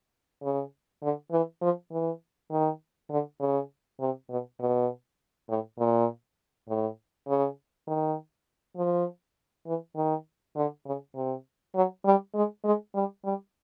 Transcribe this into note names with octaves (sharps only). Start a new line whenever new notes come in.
C#3
D3
E3
F3
E3
D#3
D3
C#3
C3
B2
B2
A2
A#2
A2
C#3
D#3
F3
E3
D#3
D3
C#3
C3
F#3
G3
G#3
G#3
G3
G3